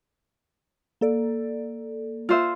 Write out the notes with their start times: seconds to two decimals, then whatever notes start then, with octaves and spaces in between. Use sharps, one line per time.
1.01 A#3 A4 D5
2.29 F4 C5 E5